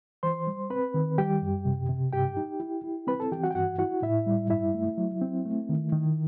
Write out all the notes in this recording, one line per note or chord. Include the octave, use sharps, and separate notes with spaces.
E3 C5 C6
G3
C4 B4 B5
D#3
G3 G4 G5
F#2
C3
C3
G2 G4 G5
D#4
E4
E4
C4 B4 B5
A4 A5
E3 G4 G5
F#4 F#5
G5
G2 F#4 F#5
E4 F#4 F#5
A2 E4 E5
G3
G2 E4 E5
A3
F#3
C4
A3
D#3
D#3